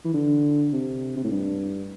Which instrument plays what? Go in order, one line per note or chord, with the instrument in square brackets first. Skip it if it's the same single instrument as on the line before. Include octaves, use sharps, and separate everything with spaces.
[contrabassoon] E3
D3
C3
C3
A2
G2